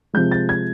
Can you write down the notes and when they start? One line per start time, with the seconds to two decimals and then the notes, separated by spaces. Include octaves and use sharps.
0.13 C3 F3 G#3 G6
0.31 A6
0.49 G#6